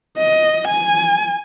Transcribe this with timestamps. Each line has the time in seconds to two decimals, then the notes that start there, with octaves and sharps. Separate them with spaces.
0.18 D#5
0.68 G#5